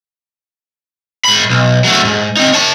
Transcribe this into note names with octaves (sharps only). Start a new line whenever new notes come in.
G#2 B5
B1
F#3 A3
G#2
C4 D#4
C#5 A5